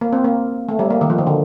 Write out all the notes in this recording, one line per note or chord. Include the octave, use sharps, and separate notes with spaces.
A#3
C4
A#3
A3
G3
A#3
D#3
F3
D#3
D3